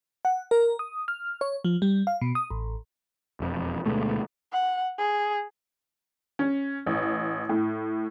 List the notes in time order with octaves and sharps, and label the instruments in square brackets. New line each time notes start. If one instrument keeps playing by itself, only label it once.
[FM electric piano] F#5
A#4
D#6
F6
C#5
F3
G3
F5
B2
D#6
A1
[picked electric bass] E1 F2
D2 B2 G#3 A3
[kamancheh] F#5
G#4
[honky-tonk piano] C#4
A1
A2